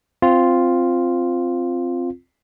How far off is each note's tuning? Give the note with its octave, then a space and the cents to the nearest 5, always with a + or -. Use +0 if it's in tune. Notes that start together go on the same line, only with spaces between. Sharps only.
C4 +0 F4 +0